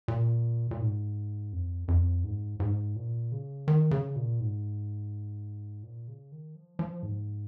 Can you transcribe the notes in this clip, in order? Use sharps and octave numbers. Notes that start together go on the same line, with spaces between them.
A#2
A#2
G#2
F2
F2
G#2
G#2
A#2
C#3
D#3
C#3
A#2
G#2
A#2
C#3
D#3
F3
F3
G#2